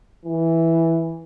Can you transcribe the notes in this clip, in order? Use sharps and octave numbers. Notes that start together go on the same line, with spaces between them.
E3